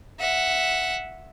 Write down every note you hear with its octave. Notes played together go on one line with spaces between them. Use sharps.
E5 F#5